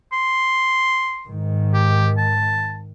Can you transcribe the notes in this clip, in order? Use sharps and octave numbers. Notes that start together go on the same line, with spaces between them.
C6
G#2 D#3
G4
A5